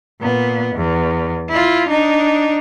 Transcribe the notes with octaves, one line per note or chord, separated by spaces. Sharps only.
A#2 B3
E2
E4 F4
D4 D#4